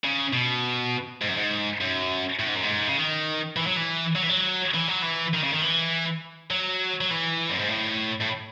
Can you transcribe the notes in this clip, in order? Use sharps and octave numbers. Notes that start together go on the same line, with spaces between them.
C#3
B2
G#2
F#2
G#2
F#2
A2
G#2
F#2
G#2
C#3
D#3
E3
F#3
E3
F#3
E3
F#3
E3
F#3
E3
D#3
C#3
D#3
E3
F#3
F#3
E3
F#2
G#2
A2
A2